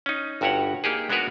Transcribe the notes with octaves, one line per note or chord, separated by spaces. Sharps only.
C#4 D#4
G1 G2 F#4 G4 C#5 F#5
A#3 D#4 G4 G#4
G#3 B3 D4 F#4 A#4 B4